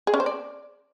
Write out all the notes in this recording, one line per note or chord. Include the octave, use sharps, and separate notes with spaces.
G#4
C#4
C5
D5